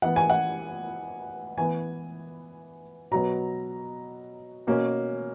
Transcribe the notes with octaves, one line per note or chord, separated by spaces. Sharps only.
E3 B3 F#5
G#5
F#5
E3 B3 G#5
B2 F#3 B3 A#5
B2 A#3 C#4